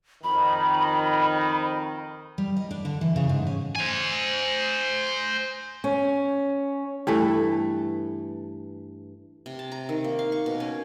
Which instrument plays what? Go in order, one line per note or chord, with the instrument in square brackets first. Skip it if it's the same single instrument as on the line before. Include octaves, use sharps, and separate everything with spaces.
[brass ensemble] F2 D#3 [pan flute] B5
[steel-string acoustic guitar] G3
D#5
D4
D3
E3
C#3
G#2
C#4
[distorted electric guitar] C5 G#5
[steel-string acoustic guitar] C#4
[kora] G2 E3 A3
[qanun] C3
A5
A#5
D#3
A#3
F5
C#6
B2
C#4